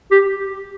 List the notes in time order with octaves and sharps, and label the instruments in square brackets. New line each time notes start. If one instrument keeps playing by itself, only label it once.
[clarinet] G4